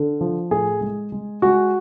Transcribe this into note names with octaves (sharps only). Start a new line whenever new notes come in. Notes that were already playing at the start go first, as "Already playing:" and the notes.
Already playing: D3
F3
A2 G#4
G#3
G#3
G#3 F#4